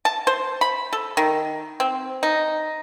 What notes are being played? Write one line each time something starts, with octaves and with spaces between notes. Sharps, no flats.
A5
C5
B5
A4
D#3
C4
D#4